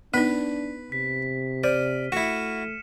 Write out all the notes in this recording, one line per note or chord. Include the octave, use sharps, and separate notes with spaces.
B3 D4 D#4 B4
C3 B6
C5 D5 F6 D#7
A3 E4 F#4 C#7 E7